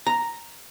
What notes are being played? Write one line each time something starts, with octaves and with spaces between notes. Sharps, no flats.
A#5